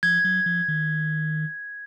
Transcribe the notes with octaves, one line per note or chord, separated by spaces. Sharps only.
F3 G#6
F#3
F3
D#3